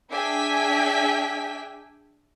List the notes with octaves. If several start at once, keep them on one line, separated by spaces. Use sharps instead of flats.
D4 G#4 E5 G5 G#5 B6